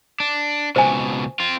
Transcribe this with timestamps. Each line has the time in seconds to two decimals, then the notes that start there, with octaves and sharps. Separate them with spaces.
0.20 D4
0.76 C#2 B2 C5 E5 G#5
1.40 C4 F4